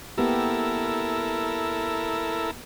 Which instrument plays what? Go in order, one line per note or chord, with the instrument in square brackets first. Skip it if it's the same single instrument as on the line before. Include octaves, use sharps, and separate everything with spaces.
[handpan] A#3 B3 G4 [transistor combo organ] E4 A4 A#4